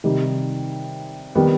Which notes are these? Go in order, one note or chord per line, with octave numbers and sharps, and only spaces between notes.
C3 D#3 G3 D#4
D#3 G3 B3